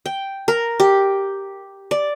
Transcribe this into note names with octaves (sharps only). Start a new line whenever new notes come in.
G5
A#4
G4
D5